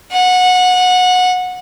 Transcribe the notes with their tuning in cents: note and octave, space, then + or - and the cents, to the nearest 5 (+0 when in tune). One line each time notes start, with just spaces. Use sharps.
F#5 -20